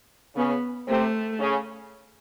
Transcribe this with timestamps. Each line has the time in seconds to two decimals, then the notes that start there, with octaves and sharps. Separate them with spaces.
0.36 C#3 B3 C#4
0.87 C3 A3 C4
1.39 C#3 C#4